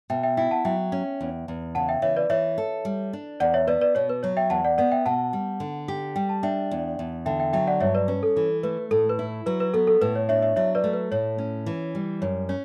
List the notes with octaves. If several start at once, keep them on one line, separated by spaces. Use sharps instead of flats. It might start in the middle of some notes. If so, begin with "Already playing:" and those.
B2 E5 G5
E5 G5
E4 E5 G5
F#5 A5
F#3 E5 G5
C#4
E2
E2
C#3 F#5 A5
E5 G5
E3 C#5 E5
B4 D5
E3 C#5 E5
A4
G3
D4
E2 D5 F#5
C#5 E5
B3 B4 D5
B4 D5
B2 C#5
B4
F#3 C#5
E5 G5
E2 F#5 A5
D5 F#5
B3 D5 F#5
E5 G5
B2 F#5 A5
G3
D3
G4
G3 G5
A5
D4 E5 G5
E2
E2
D3 E5 G5
E5 G5
F#3 E5 G5
D5 F#5
G2 C#5 E5
B4 D5
C#4 B4
A4
E3 A4
A3 B4
A2 A4
B4
E4
F#3 B4
B4
B3 A4
A4
A2 B4
C#5
D4 C#5 E5
C#5 E5
F#3 C#5 E5
B4 D5
A3
B4
A2 C#5
C#4
E3
G3
F#2 C#5
C#4 C#5